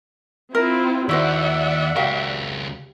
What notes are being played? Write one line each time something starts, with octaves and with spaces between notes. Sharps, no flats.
C4 E4 F4 A#4
D#2 E4 F#4 C5 D5 E5 F#5
C#2 F#4 G4 A#4 F5